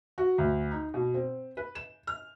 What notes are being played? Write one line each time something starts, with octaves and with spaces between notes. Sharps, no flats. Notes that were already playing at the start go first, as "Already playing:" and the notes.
F#4
D2
D#4
B2
C4
B4
E7
F6